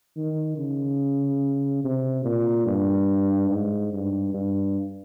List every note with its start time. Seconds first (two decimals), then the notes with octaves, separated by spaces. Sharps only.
0.17 D#3
0.58 C#3
1.84 C3
2.25 A#2
2.67 G2
3.50 G#2
3.93 G2
4.34 G2